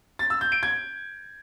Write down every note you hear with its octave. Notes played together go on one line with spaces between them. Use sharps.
A6
E6
G6
D7
G#6